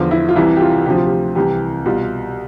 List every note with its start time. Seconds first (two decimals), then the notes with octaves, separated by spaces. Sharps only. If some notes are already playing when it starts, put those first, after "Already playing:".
Already playing: E2 D3 F3 F4
0.11 E4
0.29 F4
0.36 C2 C3 E3 E4
0.56 G4
0.61 F4
0.86 D2 C3 F3 G4
0.96 F4
1.06 G4
1.35 C2 C3 E3 G4
1.86 C2 B2 F4